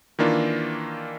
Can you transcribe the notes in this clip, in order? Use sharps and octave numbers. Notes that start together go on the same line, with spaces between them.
D#3 E3 A#3 D4 F4